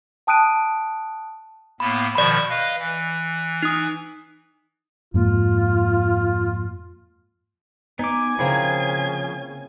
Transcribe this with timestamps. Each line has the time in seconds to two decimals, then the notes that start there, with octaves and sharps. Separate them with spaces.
0.27 G5 A5 D#6 F#6 D7 D#7
1.80 A2 A#3 B3 B5
2.15 B2 D#3 F3 D5 B5
2.49 B4 D#5 F5
2.78 E3
3.63 D#4 D#6
5.14 F2 G#2 A#3 F4
7.99 B3 D#4 G#5 D6
8.39 C#3 F3 A#3 C4 E4 G#4